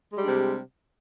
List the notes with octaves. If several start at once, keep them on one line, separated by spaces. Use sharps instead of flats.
C3 G3 G#3 D4